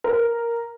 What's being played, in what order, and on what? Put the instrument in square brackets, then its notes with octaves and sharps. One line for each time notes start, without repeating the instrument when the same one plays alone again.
[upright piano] A#4